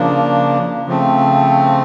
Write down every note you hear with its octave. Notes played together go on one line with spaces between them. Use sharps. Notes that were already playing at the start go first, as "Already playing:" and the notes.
Already playing: C#3 F3 A#3 D4
C#3 F3 A3 C4